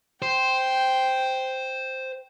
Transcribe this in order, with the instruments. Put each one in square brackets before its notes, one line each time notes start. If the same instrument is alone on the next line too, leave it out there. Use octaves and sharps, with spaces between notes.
[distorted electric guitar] C5 [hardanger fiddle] G5